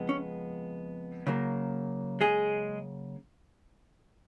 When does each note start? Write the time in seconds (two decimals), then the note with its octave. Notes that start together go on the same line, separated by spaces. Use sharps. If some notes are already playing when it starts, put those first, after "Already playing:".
Already playing: F2 C#3 G#3 B3
0.09 C#4
1.27 C#3 F#3 A#3
2.21 G#3 G#4